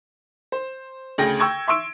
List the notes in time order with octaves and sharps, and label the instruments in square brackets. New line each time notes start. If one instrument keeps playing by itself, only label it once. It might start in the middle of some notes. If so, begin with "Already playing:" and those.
[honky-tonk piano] C5
D2 C#3 G#4 G5 A#6
G5 C#6 E6 G#6
E5 C6 C#6 E6 D7